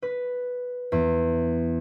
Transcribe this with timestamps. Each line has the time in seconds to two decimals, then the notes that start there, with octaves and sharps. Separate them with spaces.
0.02 B4
0.92 E2